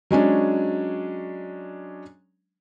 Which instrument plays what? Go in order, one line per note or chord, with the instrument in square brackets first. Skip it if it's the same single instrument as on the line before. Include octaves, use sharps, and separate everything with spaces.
[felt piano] F#3 G#3 C#4 D4